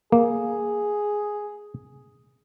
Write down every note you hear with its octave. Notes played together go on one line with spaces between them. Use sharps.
A#3 G#4